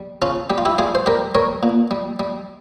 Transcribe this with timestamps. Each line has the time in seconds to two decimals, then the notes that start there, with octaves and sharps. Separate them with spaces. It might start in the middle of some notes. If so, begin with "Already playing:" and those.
Already playing: G3
0.22 C#3 C#4 F4
0.50 G3 G4
0.58 F4
0.65 E4 G4
0.78 G3 F4 G#4
0.95 C5
1.06 G3 G4 A#4
1.35 G3 A#4 C#5
1.63 A#2
1.91 G3
2.20 G3